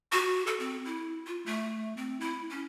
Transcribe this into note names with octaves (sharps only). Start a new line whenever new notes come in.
F#4
A4
C4
E4
F4
A3
C4
E4
C#4